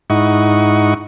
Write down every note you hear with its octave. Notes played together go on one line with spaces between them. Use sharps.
G#2 D#4 E4 D#5 F#5 C#6